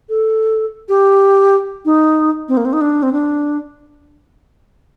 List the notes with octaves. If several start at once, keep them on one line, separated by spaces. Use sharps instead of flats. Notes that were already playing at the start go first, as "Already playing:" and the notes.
A4
G4
D#4
C4
A#3
C4
D#4
D4
C4
D4